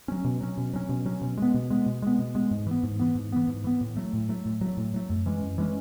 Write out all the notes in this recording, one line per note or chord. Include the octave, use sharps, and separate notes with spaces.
F#3 C#4
B2
F#3 C#4
B2
F#3 C#4
B2
F#3 C#4
B2
G#3 B3
B2
G#3 B3
B2
G#3 B3
B2
G#3 B3
G#2
E3 B3
G#2
E3 B3
G#2
E3 B3
G#2
E3 B3
A2
F#3 A3
A2
F#3 A3
A2
F#3 A3
A2
F#3 A3
F#2
E3 G#3 C#4
F#2
E3 G#3 C#4